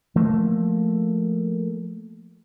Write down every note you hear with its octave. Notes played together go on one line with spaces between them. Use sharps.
F3 A3 A#3